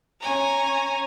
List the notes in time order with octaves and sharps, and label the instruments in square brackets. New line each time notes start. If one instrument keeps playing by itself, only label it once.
[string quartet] C#4 C#5 G#5 A#5